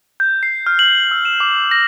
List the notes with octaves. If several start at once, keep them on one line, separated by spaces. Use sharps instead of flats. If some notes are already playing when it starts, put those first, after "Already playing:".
G6
C7
F6
F#7
E6
E7
D6
A#6